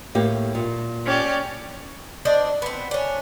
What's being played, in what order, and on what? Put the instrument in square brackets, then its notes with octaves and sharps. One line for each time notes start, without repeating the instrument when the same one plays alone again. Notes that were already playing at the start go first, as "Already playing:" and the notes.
[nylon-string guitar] A2 A#3 G4
A#2
[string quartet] C#4 G4 D5
[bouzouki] D4 C5 D5 D#5
B3 C4
C#4 D4